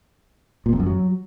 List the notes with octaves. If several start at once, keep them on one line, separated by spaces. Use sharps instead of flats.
A#2
F2
F#2
F#3